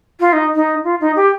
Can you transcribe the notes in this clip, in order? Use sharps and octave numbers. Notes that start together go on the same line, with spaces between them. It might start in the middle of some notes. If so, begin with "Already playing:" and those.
F4
D#4
D#4
F4
D#4
G4